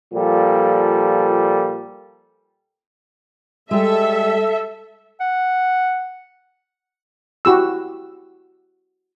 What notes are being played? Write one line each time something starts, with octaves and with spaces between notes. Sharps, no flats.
A#2 F3 G3 A4
G3 G#3 A4 E5
F#5
E4 F#4 G4 E6